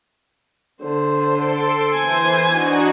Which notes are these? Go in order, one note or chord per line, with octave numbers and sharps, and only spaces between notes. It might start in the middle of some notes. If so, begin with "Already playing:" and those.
D3 C5
A4 C6 D7
E3 C5 G#5
D4 D#4 F#4